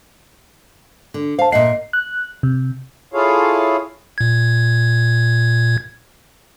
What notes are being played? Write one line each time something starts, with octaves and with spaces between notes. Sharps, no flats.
D3
C5 F5 A5
A#2 D#5 E5 F#5 C7
F#6
C3
E4 F4 G#4 A4 C#5 F5
A#2 G#6